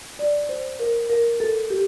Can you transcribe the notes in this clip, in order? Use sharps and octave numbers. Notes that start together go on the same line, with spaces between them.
D5
C5
A#4
A#4
A4
G4